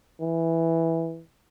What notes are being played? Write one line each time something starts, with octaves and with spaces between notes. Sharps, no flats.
E3